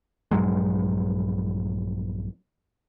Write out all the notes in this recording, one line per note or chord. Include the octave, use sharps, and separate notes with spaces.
A#1 G2 F#3 G#3